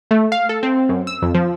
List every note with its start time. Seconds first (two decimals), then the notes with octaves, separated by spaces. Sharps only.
0.11 A3
0.32 F5
0.49 A4
0.63 C4
0.89 F#2
1.07 E6
1.22 F2
1.34 F3